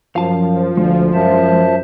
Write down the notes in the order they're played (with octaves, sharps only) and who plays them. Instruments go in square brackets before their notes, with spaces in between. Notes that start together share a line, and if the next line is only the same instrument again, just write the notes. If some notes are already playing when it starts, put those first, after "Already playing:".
[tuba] F#2 [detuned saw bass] F3 [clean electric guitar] F5 A5
[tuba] D2 [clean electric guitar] G#3
[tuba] F#2 [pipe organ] C5 E5 A5